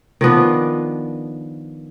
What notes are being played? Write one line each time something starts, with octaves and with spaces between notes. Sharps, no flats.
D#3 F3 B3 D4